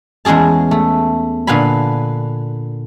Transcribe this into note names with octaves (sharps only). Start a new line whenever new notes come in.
E2 G#3 C#4 G#4 A5
A3
A#2 D3 B4 F5 G#5 B5